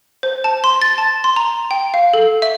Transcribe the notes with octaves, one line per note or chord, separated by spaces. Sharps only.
C5
A5
C6
A6
A5
C6
A#5
G5
F5
A4
E5